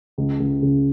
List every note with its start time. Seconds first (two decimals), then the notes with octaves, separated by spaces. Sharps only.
0.18 C#2
0.40 C#2
0.62 C#3